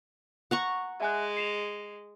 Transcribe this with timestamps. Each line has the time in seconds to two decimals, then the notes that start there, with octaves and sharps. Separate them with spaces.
0.51 F#5 A#5 C#6
1.00 G#3 E5 G#5 F#6
1.37 C7 E7 F7